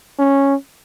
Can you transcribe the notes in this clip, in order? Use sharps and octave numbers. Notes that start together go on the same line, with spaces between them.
C#4